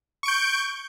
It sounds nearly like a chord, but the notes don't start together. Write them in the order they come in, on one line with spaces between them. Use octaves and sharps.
C#6 D7 G6